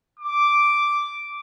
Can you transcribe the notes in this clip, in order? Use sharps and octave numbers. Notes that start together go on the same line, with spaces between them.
D6